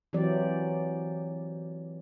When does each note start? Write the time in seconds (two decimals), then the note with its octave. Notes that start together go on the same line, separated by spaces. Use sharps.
0.13 E3 F#3 C4 G4 D5